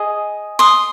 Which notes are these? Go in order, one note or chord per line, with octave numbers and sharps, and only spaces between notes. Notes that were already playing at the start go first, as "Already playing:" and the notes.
Already playing: G#4 D#5
C6 D#6